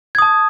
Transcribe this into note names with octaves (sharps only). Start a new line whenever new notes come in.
A5 D#6 G#6